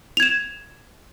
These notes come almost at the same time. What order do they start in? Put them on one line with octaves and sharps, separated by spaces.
F7 G#6 E7